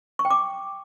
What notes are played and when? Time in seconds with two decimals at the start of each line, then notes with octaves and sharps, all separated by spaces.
0.19 C#6
0.25 G5
0.30 D6